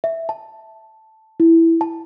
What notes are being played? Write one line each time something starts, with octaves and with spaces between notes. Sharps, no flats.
E5
A5
E4
A5